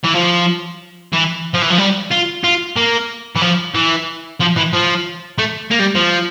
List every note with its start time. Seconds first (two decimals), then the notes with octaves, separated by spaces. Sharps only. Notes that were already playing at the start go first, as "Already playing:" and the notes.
0.04 E3
0.15 F3
1.13 E3
1.54 F3
1.62 E3
1.70 F3
1.78 G3
2.11 F4
2.44 F4
2.76 A#3
3.36 E3
3.42 F3
3.75 E3
4.40 F3
4.56 E3
4.73 F3
5.38 A3
5.71 A#3
5.80 G3
5.95 F3